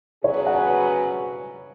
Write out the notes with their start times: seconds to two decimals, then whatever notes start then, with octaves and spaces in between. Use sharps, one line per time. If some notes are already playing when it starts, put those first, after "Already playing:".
0.24 B2 F#3 C#4 G#4 B4 C#5
0.47 F#5
0.54 G#5